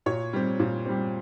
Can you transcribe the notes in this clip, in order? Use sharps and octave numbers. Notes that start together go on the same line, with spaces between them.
A#2 C#5
G3 C4
A#2
G3 C4